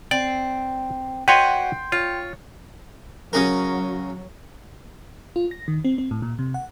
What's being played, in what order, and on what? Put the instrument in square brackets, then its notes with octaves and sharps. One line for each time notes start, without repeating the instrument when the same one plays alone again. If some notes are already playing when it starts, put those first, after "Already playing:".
[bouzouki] C4 [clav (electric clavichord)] D5
[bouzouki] F#4 [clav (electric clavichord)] B4 C#5 D#5 [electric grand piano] G5 C6
[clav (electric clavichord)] F4 [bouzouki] C#5
[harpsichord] C#3 G#4 A#4 [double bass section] F#3
[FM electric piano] F4
A#6
D#3
C4
C4
A2
A#2
C3
F#5